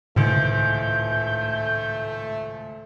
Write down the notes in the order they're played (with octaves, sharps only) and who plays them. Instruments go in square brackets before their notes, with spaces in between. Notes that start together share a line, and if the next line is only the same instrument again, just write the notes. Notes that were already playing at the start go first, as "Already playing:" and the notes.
[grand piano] G#1 C#2 [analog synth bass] A2 [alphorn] A3 [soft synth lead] G6